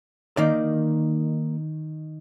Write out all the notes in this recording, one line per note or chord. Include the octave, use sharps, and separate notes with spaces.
D#3 A#3 D#4 D5